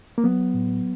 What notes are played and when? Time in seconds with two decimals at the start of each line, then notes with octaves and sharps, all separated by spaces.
0.18 A#3
0.24 F#3 B3
0.54 A2